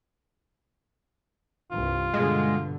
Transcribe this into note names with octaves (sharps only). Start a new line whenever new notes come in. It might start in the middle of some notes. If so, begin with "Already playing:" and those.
C2 G2 F4
G2 B2 D3 G#3